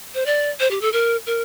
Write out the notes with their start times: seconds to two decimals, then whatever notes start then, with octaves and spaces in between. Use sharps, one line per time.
0.15 C5
0.26 D5
0.60 C5
0.71 G4
0.81 A4
0.93 A#4
1.26 A#4